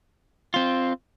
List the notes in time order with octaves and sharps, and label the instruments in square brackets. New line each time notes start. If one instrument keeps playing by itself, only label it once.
[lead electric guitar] C4 F4